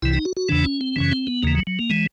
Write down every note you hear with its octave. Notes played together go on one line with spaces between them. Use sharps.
C2 C3 E3 E4
D#4
F#4
F#4
E2 C#3 E3 D4
C#4
C4
F#2 C#3 E3 C#4
C4
B3
D#2 C#3 E3 A#3
F#3
F#3
A#3
E3 G#3